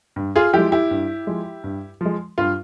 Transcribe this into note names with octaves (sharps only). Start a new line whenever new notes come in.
G2
F4 G#4
F3 G#3 E4 G4
E4 G4
G2
F3 G#3
G2
F3 G#3
G2 F4